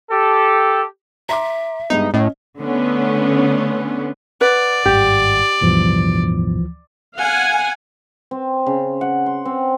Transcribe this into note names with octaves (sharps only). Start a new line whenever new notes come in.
G4 A4
E5 A#5 C6 D6
G2 G#3 B3 D#4
A2 C#4 D#5
D3 A3 B3 C#4
B4 D5 F#5
G#1 G2 G4
D1 D2 G2 B2 E3 F3
F5 F#5 G#5
C4
C#3
F#5
C6
C4